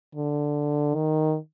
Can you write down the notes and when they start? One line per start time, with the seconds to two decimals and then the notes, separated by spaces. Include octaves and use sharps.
0.16 D3
0.95 D#3